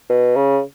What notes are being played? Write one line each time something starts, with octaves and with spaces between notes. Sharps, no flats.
B2
C#3